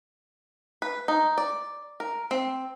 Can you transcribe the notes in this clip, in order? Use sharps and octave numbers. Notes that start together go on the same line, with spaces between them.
B4
D#4
D5
A#4
C4